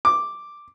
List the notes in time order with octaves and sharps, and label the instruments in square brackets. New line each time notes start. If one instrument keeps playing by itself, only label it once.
[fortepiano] D6